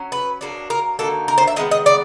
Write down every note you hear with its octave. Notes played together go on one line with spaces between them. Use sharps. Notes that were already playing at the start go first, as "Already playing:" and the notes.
Already playing: F#3 C#4
B4
B2 F#3 A#3 D4
A#4
D3 F#3 A#3 D#4 A4
A#4
C5
E5
D#3 G#3 B3 D#5
D#5
D5